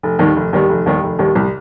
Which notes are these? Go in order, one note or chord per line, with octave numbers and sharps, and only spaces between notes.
F1
D#2 D#3 G3
F1
D#2 D#3 G3
F1
D#2 D#3 G3
F1
D#2 D#3 G3
C2